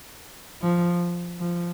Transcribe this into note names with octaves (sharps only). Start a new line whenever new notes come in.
F3
F3